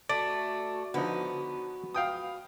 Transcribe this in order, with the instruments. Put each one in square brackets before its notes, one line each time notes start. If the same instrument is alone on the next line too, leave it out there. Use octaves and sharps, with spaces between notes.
[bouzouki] A3 [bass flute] F#4 [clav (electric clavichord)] D5
[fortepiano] D3 F3 D#4 [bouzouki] B3
[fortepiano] F5 G5 D#6